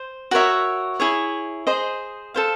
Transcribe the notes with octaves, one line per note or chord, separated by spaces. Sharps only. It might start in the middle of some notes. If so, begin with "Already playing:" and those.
Already playing: C5
F#4 A#4 C#5 E5
E4 G#4 C#5
G#4 C5 D#5
A4 C5 F5